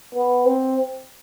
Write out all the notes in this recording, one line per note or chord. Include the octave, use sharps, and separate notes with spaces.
B3
C4